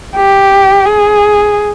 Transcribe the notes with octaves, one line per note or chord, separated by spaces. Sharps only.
G4
G#4